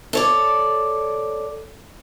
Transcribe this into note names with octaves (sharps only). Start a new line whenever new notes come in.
A4 C#5 D5